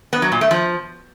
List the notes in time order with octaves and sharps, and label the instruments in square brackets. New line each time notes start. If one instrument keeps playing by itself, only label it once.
[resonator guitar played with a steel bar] B3
F#3
A#2
A3
F3